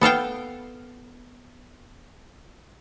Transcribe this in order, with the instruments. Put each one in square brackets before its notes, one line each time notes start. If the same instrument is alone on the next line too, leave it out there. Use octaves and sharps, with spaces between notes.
[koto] B3 A4 F5 G5